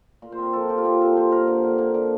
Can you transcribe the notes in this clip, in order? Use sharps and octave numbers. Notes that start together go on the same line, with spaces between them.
A#2
C5
C4 A#4
F3 A4
F3 G4
F4
A#2 G4
C4 A4
F3 C5
A#2 A#4
D3
D3
A#3
D3